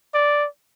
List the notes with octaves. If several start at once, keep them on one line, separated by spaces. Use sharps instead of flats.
D5